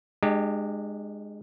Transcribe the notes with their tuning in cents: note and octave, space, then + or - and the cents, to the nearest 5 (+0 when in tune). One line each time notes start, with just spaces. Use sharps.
G#3 +0 D4 +45 G4 +0